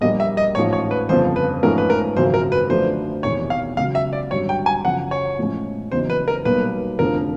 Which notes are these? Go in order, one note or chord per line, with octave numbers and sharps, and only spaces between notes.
A#1 A#2 G3 A#3 D#5
E5
D#5
A1 G#2 F3 C#5
C#5
B4
G1 F2 C#3 F3 C5
B4
G#2 F3 A3 C#4 A#4
B4
A#4
G#1 F#2 C#3 F3 C5
A#4
B4
F#2 D3 F3 A3 D4 C5
E1 E2 C3 D#3 C#5
F5
C#2 C#3 F#3 F5
E5
D5
G#1 F#2 D3 G3 C#5
G5
G#5
F#2 C#3 F3 F#5
C#5
A2 F3 G#3 C#4
E2 C#3 F#3 A#3 D#4 C5
B4
A#4
B1 A#2 G3 A#3 D#4 B4
F1 F2 D3 F3 A#4